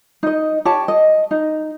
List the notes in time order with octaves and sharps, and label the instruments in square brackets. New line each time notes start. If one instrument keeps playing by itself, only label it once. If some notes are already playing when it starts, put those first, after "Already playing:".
[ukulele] D#4 D#5
G4 C#5 A5
D#5
D#4